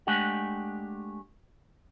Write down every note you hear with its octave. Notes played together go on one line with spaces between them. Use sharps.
G#3 A3 D4 G4 F#5